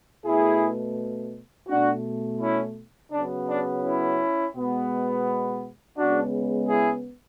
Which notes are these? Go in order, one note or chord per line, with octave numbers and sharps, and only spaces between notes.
B2 A3 E4 G#4
B2 A3 D4 F#4
C#4 E4
C#3 F#3 B3 D4
D4
C#4 E4
B2 G#3 B3
C#3 G#3 B3 D4 F#4
E4 G#4